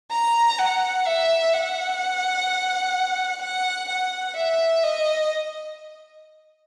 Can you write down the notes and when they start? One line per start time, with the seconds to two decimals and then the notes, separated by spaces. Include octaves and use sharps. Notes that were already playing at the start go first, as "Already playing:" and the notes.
0.11 A#5
0.59 F#5
1.06 E5
1.53 F#5
3.42 F#5
3.89 F#5
4.37 E5
4.83 D#5